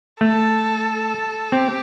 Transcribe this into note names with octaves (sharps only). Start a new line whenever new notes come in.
A3 A4
C4 G4